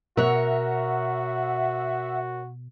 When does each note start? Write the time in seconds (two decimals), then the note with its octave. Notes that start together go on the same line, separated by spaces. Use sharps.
0.17 B2 F#4 A#4 C#5 E5 F#5